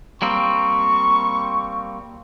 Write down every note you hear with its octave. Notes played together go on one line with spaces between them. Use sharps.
G3 A#3 C4 C#6